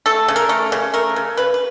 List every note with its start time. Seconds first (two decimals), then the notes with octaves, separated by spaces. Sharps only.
0.06 A3 A4
0.28 C#3
0.36 A#4
0.49 A3
0.72 C#3
0.94 A3 A#4
1.16 C#3
1.37 C#3 B4
1.54 B4